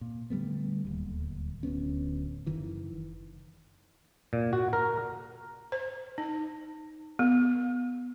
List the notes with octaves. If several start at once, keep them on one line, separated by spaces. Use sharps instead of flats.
A#2
D3 G3 A3 B3
D1 D#2
D1 D2 B3 C#4
F#1 D#3 E3
A#2
F#4
A#4
C5
D#4
B3